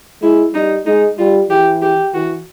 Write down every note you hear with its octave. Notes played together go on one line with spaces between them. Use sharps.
G#3 E4
G3 D#4
G#3 D#4
G3 F4
E3 G4
G4
E3 F#4